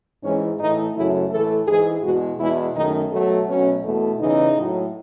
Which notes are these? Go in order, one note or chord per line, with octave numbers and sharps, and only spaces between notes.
G#2 E3 G#3 C#4
A2 E3 A3 D#4
F#2 C#3 F#3 A3 E4
A2 E3 A3 A4
G#2 E3 G#3 G#4
E2 B2 G#3 F#4
E2 B2 G#3 E4
F#2 D#3 A3 D#4
B2 F#3 A3
B2 F#3 A3 C#4
E2 B2 A3
E2 C#3 E3 D#4
A2 F#3 A3